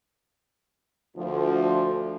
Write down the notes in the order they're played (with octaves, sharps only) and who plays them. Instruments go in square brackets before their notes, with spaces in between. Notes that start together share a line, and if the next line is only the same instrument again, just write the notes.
[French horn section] D2 [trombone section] F3